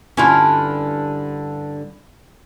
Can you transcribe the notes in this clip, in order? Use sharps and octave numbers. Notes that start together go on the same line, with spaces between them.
G2 D3 C#4 E4 F4